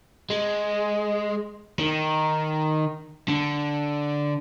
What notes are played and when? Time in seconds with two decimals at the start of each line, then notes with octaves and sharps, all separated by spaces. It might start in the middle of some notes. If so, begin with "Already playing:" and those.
0.30 G#3
1.79 D#3
3.29 D3